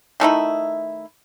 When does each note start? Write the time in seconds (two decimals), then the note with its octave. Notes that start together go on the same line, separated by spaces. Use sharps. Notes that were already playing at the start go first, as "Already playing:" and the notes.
0.20 D#3 A3 D#4 E4